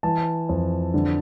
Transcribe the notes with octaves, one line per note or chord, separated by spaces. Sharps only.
E3 A5
F2
D3